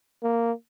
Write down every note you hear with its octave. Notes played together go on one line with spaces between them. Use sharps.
A#3